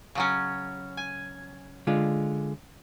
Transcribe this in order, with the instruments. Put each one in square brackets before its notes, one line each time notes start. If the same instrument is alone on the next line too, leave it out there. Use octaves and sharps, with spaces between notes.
[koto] C#3 F#3 C#4
G#5
[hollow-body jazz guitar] D3 G#3 F4